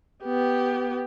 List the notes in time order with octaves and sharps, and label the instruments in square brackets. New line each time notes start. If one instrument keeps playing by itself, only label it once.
[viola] B3 G4